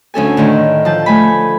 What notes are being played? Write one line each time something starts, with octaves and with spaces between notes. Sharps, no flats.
D2 C#4 A4 G#5
A2 D3 D#3
F3 A5 G6
A3 G#5 B5